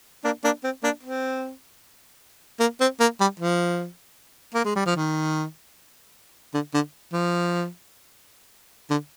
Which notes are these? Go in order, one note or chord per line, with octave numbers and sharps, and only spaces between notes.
A#3 D4
A#3 D4
C4
A#3 D4
C4
A#3
C4
A#3
G3
F3
A#3
G#3
G3
F3
D#3
D3
D3
F3
D3